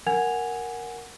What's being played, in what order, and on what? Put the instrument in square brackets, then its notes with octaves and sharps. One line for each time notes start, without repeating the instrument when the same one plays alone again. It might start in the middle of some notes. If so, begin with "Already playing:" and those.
[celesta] A#4 F#5 G#5 G#6 F7